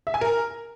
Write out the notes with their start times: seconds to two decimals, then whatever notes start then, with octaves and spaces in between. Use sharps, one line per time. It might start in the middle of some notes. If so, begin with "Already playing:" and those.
0.07 E5
0.14 G#5
0.21 A#4